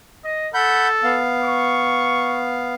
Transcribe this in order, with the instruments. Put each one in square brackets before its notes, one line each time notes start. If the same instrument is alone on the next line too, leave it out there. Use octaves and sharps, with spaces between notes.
[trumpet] D#5
[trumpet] A4 [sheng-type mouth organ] F#5 B5 G6
[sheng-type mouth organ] B3 F5
[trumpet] C#6